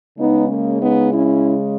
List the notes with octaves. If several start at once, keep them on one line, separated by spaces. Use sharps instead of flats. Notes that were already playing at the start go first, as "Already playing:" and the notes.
C#3 G#3 B3 D#4
A#3 C#4
B3 D#4
C#4 E4